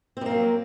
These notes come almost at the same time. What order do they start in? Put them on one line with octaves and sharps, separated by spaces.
C4 G3 A#3 F#3